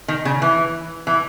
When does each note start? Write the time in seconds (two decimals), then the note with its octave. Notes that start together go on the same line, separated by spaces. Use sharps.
0.08 D#3
0.25 C#3
0.42 E3
1.07 E3